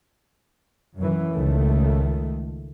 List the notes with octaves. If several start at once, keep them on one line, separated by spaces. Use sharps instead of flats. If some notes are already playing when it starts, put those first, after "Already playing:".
F#2 E3
C#2 D#3 A3